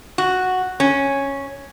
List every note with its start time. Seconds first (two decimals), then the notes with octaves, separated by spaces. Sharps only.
0.18 F#4
0.80 C#4